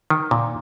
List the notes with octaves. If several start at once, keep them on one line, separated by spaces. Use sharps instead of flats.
D#3
A#2